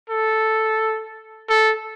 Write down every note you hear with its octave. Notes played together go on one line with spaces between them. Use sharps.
A4
A4